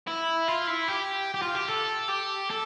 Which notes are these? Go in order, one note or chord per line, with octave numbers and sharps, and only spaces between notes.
E4
F4
E4
G4
G4
F4
G4
A4
G4
A4